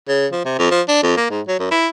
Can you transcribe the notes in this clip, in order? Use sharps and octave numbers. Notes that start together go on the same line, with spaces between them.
C#3
F3
C3
F2
F3
D4
F2
A#3
G#2
F#3
F#2
E4